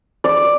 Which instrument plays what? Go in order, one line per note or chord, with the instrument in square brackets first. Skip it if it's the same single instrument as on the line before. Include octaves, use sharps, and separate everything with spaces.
[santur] D5